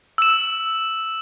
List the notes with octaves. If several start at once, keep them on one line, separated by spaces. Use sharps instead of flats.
E6 E7